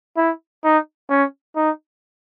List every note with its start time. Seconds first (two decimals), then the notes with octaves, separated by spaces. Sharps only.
0.17 E4
0.64 D#4
1.10 C#4
1.56 D#4